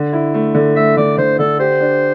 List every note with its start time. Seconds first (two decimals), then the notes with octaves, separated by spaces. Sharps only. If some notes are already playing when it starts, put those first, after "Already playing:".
Already playing: D3
0.13 E4
0.34 A3
0.55 D3
0.76 A3 E5
0.97 D3 D5
1.18 D3 C5
1.39 D3 A4
1.59 G4 C5
1.80 D4